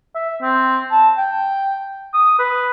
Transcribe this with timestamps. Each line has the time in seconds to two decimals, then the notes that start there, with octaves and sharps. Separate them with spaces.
0.15 E5
0.42 C4
0.91 A5
1.18 G5
2.13 D#6
2.39 B4